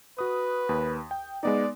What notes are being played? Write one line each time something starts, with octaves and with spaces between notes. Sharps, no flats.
F#4 B4 D#6
D#2
G5
G#3 B3 D#4 D5